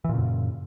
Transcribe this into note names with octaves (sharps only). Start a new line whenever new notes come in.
F#2 A#2 C#3 E3